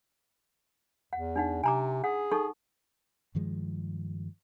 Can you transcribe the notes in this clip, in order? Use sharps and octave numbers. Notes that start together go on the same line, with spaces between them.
E2 F#5
D4 D#4 F#5
C3 G#5 A#5 D6
G#4 F#5
D#4 A4 C#6
G2 D#3 F3 G#3